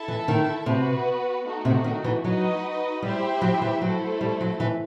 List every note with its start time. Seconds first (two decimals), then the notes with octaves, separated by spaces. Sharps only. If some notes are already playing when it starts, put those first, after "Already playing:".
Already playing: E4 A4 E5 A5
0.08 E3
0.28 D#3
0.66 C3 B3 F#4 B4
1.46 A3 D#4 F#4
1.65 C3
1.84 D#3
2.04 E3
2.24 F#3 D#4 F#4 B4 D#5
3.02 G3 E4 G4 C5 E5 G5
3.42 F#3
3.62 E3
3.81 F#3 A3 E4 A4 C5
4.21 G3
4.41 F#3
4.60 E3